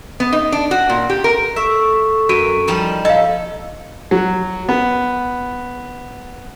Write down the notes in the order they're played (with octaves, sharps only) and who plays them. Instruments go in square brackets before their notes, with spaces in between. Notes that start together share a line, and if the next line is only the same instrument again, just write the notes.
[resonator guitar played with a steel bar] B3
D#4
D4
F#4
A#2
G4
A#4
[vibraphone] A4 C#6 [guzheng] E5
[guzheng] F#2 [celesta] F#4 D7 D#7
[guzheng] F3 G3 D#4
[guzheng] A4 [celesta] D#5 F5
[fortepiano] F#3
B3